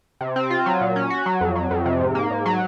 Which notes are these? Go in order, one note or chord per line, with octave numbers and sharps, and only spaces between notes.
C3
C4
F4
F#3
A#2
C#4
F#4
F#3
F2
F#3
F2
C3
G#2
A#3
G#2
F#3